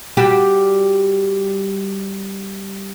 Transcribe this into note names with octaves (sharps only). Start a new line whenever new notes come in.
G3 F#4 G4